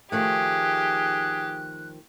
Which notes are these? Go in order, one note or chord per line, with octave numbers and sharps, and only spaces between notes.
D#3 F3 A3 G4 G#4 F#6